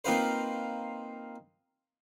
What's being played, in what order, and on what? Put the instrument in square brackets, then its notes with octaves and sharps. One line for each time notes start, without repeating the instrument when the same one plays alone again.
[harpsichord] A#3 C4 D#4 F4 B4 C5